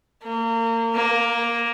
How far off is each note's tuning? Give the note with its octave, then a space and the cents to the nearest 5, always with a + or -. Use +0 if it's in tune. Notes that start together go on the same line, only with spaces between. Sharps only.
A#3 -30
A#3 +10